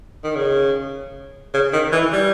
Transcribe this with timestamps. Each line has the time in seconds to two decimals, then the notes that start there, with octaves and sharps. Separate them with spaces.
0.24 D#3
0.35 C#3
1.54 C#3
1.73 D#3
1.92 E3
2.13 G3